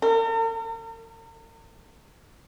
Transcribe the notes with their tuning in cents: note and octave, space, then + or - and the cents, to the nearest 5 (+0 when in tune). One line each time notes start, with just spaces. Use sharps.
A#4 -45